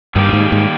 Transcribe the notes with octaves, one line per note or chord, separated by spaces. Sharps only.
G2 D#3 G3 A#3 D#4 G4
A#2
G#2
G#2